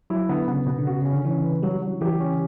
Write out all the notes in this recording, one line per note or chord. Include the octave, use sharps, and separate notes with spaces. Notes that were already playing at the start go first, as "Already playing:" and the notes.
F#3 E4
D3 B3
C#3 B3
B2 B3
D3
C#3 F#4
C#3 C#4
D3
E3 C#4
B4
F#3 G3
F#3
E3 G4
C#4